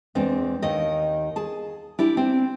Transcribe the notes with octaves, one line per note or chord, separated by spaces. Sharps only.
E2 G#3 C4 D4
D#2 D#3 D#5
G#4 A5
D4 E4 G4
C4 D4